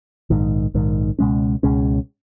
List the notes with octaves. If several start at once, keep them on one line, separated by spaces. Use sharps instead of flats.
A#1 G#2 D#3
A#1 G#2 D#3
C#2 B2 G#3 C#4
C#2 B2 G#3 C#4